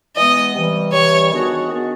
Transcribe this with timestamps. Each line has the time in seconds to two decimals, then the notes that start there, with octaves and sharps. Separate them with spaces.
0.17 E3 G#3 B3 D#5
0.55 C3 E3 G3
0.93 C3 E3 G3 C#5
1.31 D#3 G#3 B3 D4 F#4
1.69 D#3 G#3 B3 D4 F#4